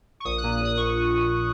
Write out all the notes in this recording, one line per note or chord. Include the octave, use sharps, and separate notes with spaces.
C#6
A#1 D#6
F#6
A#2
F#6
A#1
D#6
A#1 C#6